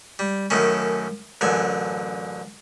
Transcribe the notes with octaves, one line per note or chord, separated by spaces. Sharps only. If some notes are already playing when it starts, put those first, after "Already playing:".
G3
F#2 A2 D#3 C#4
A1 F#2 D3 G#5